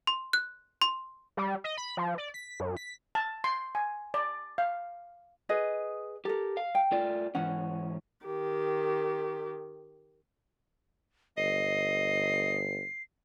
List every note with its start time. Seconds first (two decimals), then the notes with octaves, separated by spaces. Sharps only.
0.07 C6
0.33 F#6
0.82 C6
1.37 G3
1.64 D#5
1.77 B5
1.97 F3
2.18 D5
2.34 B6
2.60 F#2
2.77 B6
3.15 A5
3.44 C6
3.75 G#5
4.14 D5
4.58 F5
5.49 G#4 B4 D#5
6.25 G4 A4 A#4
6.57 F5
6.75 G5
6.92 A3 F4 D5
7.35 G#2 E3 C#4 F#5
8.26 D#3 G4
11.38 G1 D#5 C7